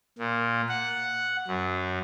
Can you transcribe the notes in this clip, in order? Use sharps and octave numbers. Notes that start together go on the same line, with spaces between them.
A#2
F#5
F#2